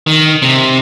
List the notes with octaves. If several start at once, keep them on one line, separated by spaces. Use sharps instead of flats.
D#3
C3